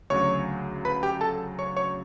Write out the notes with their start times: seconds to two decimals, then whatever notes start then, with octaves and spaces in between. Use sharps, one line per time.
0.10 D2 C#3 F#3 C#5 C#6
0.85 B4 B5
1.03 G4 G5
1.21 A4 A5
1.59 C#5 C#6
1.76 C#5 C#6